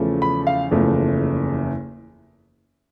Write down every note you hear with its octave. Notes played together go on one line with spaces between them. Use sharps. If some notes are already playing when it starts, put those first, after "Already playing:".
Already playing: E2 C#3 F3 A3
B5
F5
F#1 E2 C#3 F3 A3